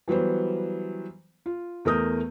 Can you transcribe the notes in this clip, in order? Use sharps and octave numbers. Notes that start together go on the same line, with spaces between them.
E3 F#3 G3 B3 C5
F4
E2 A3 A#4 D#6 G6